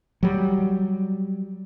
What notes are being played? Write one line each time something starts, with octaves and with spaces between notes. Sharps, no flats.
F#3 G3